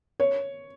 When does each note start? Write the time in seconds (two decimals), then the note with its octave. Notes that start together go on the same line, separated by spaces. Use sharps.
0.20 C#5